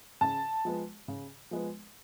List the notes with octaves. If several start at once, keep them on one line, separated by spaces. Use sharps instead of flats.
C#3 A5
F3 G#3 B3
C#3
F3 G#3 B3